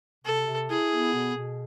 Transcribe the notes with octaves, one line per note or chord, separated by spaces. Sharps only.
C3 A4
C3
E4 G#4
B3
B2
B2